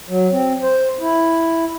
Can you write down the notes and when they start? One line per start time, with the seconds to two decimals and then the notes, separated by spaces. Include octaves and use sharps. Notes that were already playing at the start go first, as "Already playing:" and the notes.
0.09 F#3
0.32 C4
0.63 C5
1.01 E4